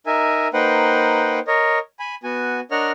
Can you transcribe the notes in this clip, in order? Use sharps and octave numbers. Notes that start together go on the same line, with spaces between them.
D#4 A#4 E5 G#5
A#3 D#4 B4 C5 F#5 G5
A#4 C#5 D#5
G#5 B5
B3 F#4 G#5
D4 A#4 C#5 D#5 F#5 F6